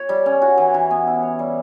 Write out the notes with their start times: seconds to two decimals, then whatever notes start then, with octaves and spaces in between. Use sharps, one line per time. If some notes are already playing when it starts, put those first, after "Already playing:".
Already playing: C#5
0.09 G3
0.26 C#4
0.42 F#4
0.58 E3
0.74 E3
0.91 B3
1.07 E4
1.23 C#5
1.39 G3